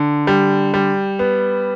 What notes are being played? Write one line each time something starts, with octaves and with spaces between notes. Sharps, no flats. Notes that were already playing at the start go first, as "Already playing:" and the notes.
Already playing: D3
G3
G3
B3